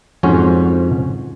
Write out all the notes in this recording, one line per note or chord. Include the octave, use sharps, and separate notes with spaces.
F2 G#2 C#4 F#4 C5 C#5